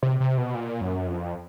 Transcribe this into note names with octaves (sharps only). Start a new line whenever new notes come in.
C3
C3
B2
A#2
F#2
F2